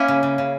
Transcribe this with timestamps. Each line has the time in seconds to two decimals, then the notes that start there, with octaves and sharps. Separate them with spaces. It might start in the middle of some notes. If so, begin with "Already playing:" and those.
Already playing: A#3 C#4 E4
0.08 C#3
0.23 C#3
0.38 C#3